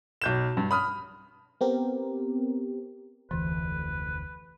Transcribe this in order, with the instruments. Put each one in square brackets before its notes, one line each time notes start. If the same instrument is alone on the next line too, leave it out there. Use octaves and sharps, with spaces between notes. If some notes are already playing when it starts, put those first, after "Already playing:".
[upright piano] B1 G6 E7
G2
B5 D#6 F6
[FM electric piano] B3 C4 G4 A#4
[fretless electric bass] F1 D2 [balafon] E3 [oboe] B4